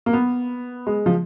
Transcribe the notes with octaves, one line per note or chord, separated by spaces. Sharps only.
A#3
B3
G#3
F3